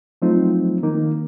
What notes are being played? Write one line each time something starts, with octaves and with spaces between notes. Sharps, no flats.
F3 F#3 A3 C4 D#4 F4
D#3 A#3 D#4